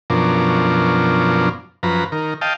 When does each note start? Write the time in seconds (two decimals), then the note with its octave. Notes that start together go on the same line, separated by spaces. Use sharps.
0.10 F#2 B2 F3 D4 A#4
1.83 F#2 F3 B4 A#5
2.12 D#3 A#4
2.41 D#5 F5 G5 A5